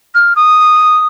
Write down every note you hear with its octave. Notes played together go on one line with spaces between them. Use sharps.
F6
D#6